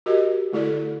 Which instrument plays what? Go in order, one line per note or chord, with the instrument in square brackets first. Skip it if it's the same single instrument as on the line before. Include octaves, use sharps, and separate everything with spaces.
[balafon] F#4 G4 A#4 D#5
D3 A3 E4 A4 D5